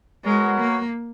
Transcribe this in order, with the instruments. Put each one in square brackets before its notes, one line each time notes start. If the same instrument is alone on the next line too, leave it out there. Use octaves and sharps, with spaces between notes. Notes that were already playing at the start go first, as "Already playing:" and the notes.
[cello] G#3 [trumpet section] B3 F#4 A#4 C#5
[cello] A#3